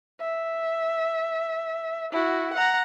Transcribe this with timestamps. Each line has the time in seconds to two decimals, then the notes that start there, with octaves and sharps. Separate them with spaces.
0.21 E5
2.12 E4 F#4
2.54 F#5 A#5